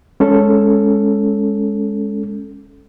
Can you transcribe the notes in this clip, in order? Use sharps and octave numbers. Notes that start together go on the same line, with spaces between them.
G#3 C#4 A4